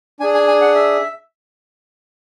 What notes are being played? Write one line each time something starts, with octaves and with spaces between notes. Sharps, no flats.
D4 G#4 G#5
G#5
G#5
F#5
E5